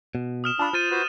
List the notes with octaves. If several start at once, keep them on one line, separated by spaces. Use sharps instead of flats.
B2
D#6 F6 E7
D4 F4 A5 B5
F4 C5 F6 A6 D#7
F#4 B4 C5